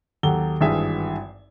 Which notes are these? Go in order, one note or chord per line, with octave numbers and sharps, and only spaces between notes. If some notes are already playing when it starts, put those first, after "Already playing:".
D#2 F#3 G4 A4 G7
G#1 G2 E3 G#4 E5